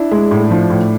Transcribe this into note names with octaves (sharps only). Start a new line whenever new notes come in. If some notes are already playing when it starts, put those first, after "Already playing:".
Already playing: D4 E4
G#3
A2
F3
A2